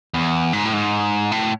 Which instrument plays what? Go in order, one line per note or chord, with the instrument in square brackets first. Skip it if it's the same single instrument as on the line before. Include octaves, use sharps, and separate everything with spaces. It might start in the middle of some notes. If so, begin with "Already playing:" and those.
[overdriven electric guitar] E2
G#2
A2
G#2
A2